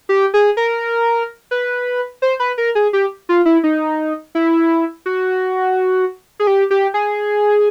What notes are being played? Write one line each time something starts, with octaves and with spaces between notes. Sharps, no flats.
G4
G#4
A#4
B4
C5
B4
A#4
G#4
G4
F4
E4
D#4
E4
F#4
G#4
G4
G4
G#4